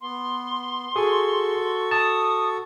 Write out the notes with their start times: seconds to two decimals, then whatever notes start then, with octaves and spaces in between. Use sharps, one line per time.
0.01 B3 C6
0.96 F#4 G#4 A4 C#6
1.91 A5 D#6